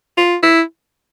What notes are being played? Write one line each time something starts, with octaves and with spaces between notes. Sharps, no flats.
F4
E4